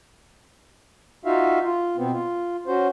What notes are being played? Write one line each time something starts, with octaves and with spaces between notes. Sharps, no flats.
D#4 F4 F#4 E5 F5
F4
B2 B3 C4
F4
C#4 F#4 C5